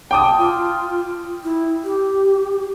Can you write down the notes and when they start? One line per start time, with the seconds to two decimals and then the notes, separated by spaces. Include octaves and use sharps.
0.11 G5 A5 D6 D#6
0.38 F4
1.43 E4
1.84 G4